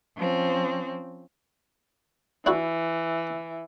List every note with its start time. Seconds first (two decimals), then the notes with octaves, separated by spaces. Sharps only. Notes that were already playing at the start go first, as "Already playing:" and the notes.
0.18 F3 C4 C#4
2.46 E3 D4 E4 F#4